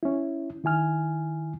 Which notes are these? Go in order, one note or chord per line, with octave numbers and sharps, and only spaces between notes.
C#4 E4
D#3 E4 G#5 F6